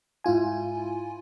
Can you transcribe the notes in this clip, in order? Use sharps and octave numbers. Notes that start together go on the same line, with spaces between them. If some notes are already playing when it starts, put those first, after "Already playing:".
G#2 E4 F4 G#5